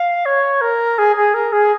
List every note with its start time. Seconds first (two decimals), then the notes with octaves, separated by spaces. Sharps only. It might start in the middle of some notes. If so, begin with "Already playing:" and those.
Already playing: F5
0.25 C#5
0.61 A#4
0.98 G#4
1.16 G#4
1.34 A#4
1.52 G#4